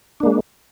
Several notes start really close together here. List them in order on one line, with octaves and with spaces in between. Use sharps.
D4 A#3 G#3